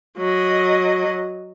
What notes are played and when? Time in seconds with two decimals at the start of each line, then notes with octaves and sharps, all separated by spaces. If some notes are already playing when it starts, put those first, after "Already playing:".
0.18 F#3 D#5